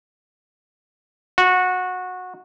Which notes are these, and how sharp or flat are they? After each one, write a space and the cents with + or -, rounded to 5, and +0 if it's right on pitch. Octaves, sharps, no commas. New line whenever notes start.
F#4 -15